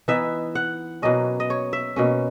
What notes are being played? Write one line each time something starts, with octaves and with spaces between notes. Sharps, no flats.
E3 B3 D#4 E5
F#5
B2 F#3 A#3 C#4 D#5
D#5
C#5
E5
B2 A#3 C#4